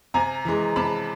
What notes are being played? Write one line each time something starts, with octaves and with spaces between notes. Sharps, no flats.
C3 G#5 A#5
E3 G#3
C3 A5 B5